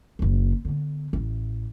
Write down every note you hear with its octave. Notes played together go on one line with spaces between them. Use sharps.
F#1 D#2
D3 B3
A1 E3